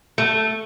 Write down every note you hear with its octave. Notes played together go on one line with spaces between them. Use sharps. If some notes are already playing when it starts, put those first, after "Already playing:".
A3